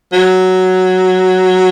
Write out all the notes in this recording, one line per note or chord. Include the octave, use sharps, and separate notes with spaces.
F#3